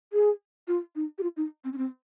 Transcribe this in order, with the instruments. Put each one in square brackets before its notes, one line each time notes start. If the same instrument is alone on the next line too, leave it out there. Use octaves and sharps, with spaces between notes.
[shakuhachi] G#4
F4
D#4
G4
F4
D#4
C4
C#4
C4